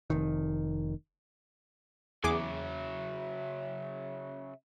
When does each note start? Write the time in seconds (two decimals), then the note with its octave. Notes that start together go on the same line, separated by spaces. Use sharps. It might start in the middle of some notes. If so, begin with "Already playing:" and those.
0.10 F1 D#3
2.24 E2 C#3 F#3 G#4 E5 D6